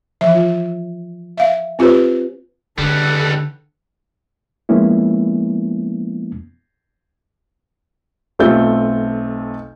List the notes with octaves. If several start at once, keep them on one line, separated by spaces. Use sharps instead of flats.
E3 F3 E5
F4
E5 F5
C4 F4 G4 B4 C5
C#2 D3 G3 A4 F#5
F3 G#3 A#3 B3 C#4 E4
B1 A3 C4 F4 G6